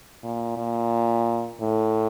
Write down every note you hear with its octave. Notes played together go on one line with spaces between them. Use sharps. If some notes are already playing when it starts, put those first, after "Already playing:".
A#2
A#2
A2